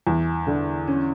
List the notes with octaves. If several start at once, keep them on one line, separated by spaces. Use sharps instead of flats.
E2
D3
C#4